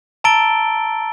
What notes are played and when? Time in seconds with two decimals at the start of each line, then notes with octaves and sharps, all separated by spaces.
0.24 A5 A#5 E6 A6 D7 G7